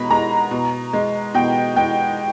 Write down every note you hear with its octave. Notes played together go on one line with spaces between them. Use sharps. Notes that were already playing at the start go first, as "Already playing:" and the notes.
Already playing: B2 G#3 A#5 B5
G#3 A#5
B2
G#3
B2 G5
G#3 G5